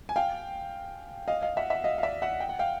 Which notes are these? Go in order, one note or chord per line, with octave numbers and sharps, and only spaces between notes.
G#5
F5 G5
D#5 F5
D#5 F5
E5 F#5
E5 F#5
D#5 F5
F5
D5 E5
E5 F#5
G5
F#5
F5 G5